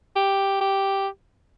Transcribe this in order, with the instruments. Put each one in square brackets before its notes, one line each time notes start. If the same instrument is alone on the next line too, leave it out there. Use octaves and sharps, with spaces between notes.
[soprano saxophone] G4
G4